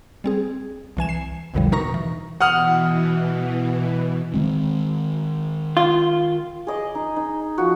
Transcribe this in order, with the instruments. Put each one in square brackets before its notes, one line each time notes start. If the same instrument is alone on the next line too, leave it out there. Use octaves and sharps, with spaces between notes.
[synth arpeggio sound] G3 C4 G#4
C2 E3 G#5 E7
C7
A#1 E2 A#2 D3 F3 G3
B2 D#4 A#4 A#5 C#6 A#6
E3
[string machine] B2 E3 [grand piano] F#5 D#6 F6
[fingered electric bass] D#3 G#3 C4
[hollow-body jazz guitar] F4
[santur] G#4 D#5 D6
D#4
D#4
F3 F#4